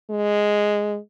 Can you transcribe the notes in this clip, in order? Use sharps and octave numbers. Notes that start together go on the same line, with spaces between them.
G#3